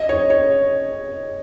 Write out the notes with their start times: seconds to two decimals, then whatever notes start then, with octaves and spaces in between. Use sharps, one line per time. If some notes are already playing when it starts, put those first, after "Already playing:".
Already playing: D#5
0.09 C#5
0.30 C#5